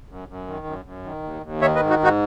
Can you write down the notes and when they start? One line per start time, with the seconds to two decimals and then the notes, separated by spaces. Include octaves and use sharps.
0.09 F#2
0.28 F#2
0.47 D#3
0.66 F#2
0.85 F#2
1.04 D#3
1.23 D#2
1.42 D#2
1.61 D#3 C#5 E5
1.75 B4 D#5
1.80 G#2
1.90 D#4 F#4
2.00 G#2 D#4 F#4